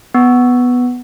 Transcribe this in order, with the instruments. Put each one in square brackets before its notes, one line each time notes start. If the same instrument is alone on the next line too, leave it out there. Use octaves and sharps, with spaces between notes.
[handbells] B3